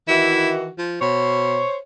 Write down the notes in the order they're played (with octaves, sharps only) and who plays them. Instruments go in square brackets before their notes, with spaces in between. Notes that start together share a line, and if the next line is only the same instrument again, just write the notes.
[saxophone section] D#3 E3 F#4 [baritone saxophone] E4
[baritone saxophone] F3
[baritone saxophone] B2 [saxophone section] C5 C#5